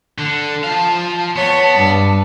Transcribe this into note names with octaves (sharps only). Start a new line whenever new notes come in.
D3
F3 F5 A5
B3 C#5 A5
G2